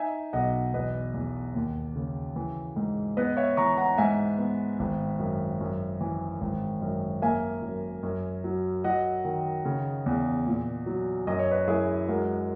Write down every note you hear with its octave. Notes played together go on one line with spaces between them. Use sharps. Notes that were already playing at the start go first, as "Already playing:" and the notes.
Already playing: D#4 E5 G#5
B1 D#5 F#5
E2 B4 D#5
E2
D#2
C#3
E3
G#2
B3 B4 D#5
C#5 E5
E3 A#5 C#6
F#5 A#5
G#2 E5 G#5
B3
G#1
F#2
F#2
E3
G#1
F#2
A#3 E5 G#5
F#2
F#2
F#3
F#3 D#5 F#5
D#3
C#3
E2
A#2
F#3
F#2 D#5
C#5
B4 D#5
F#2 E4 G#4
G#3 F#4 A#4